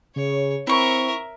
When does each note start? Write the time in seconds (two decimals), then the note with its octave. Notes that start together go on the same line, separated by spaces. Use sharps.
0.16 C#3 C#5
0.67 C4 E4 A#4 E5 C#6